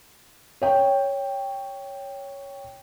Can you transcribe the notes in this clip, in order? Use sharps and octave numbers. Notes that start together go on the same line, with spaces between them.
C#5 G5